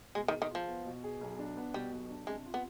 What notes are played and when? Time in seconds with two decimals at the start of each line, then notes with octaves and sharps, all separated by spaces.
0.15 B2 G#3
0.28 D#3
0.33 G#4
0.42 D#3
0.50 F3 F4
0.68 B3
0.85 B2
1.03 G#4
1.21 B1
1.39 D4
1.57 B3
1.74 B2 G3
1.92 B1
2.10 D4
2.27 C3 G#3
2.46 F4
2.54 B3